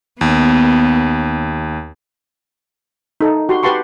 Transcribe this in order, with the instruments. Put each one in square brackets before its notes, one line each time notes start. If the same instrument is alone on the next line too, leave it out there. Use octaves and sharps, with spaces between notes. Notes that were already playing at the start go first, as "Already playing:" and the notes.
[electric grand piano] D#2 [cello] B3
[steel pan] D#4 A4
F#4 G4 C6
G4 B4 F#5 A5 C6 C#6